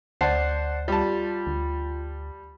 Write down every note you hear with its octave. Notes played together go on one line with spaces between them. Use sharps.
D2 C5 D5 F#5 A5 C7
G3 F4 A5
D2